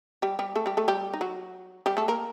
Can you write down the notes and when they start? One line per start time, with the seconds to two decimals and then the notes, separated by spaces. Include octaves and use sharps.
0.22 G3 G4
0.39 G3 G4
0.56 A3 A4
0.66 G3 G4
0.77 A3 A4
0.88 G3 G4
1.14 D#4
1.21 F#3 F#4
1.86 G3 G4
1.97 A3 A4
2.08 A#3 A#4